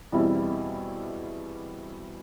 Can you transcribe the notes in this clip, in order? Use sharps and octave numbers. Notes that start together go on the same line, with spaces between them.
E2 B2 G3 C4 E4